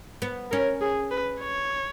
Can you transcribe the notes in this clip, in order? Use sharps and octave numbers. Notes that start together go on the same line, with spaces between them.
B3
C#4 A#4
G#4
B4
C#5